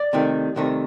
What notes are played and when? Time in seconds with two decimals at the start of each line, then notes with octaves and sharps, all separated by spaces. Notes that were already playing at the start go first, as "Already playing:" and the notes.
Already playing: D5
0.13 C2 C3 D#3 A3
0.56 C2 C3 D#3 A3